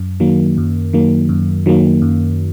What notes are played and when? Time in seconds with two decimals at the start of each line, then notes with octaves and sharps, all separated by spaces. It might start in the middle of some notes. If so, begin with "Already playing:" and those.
Already playing: F#2
0.20 D#3 F#3 A#3
0.58 F#2
0.93 D#3 F#3 A#3
1.29 F#2
1.66 D#3 F#3 A#3
2.02 F#2